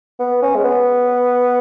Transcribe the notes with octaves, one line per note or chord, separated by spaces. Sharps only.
B3
C#4
G#3
B3